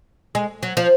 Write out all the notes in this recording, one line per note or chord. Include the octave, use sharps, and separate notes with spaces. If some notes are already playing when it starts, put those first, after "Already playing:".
G#3
F#3
F3